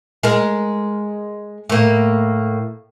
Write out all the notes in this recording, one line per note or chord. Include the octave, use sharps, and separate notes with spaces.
G#3 A#4
A2 A#3